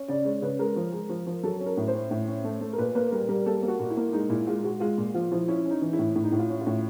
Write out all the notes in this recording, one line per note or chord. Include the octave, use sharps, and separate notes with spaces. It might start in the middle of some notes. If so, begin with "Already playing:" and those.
Already playing: C#4
C#3 D5
G#3 C#5
C#3 B4
G#3 A#4
F3
G#3
F3
F3
F#3 A4
C#4
A#4
A2
C5
C#4
A2
C#4
A3
A3
A#4
A#2 B4
A#3 B4
G3 A#4
G3 A#4
A#3 A4
A#3
F#4
A#2
E4
A#3
G#3 D#4
A#2 E4
G#3 F4
G#3 F#4
G#3 F4
A#2
F3 F4
F3 E4
C#4 E4
C#4
D#4
E3
E4
A2
A2
D#4
A2 E4
F4
C#4
F4
A2